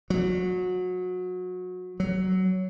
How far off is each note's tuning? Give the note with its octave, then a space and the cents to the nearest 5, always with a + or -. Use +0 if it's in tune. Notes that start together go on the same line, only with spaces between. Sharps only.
F#3 -25
F#3 +15